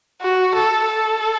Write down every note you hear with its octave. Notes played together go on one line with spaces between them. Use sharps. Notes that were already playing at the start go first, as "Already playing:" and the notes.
F#4
A4
A4